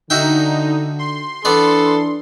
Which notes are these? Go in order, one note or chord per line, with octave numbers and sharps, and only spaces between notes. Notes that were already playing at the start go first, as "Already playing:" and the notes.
D3 D#4 F#4 E5 G5
C6
E3 B3 D4 A4 D5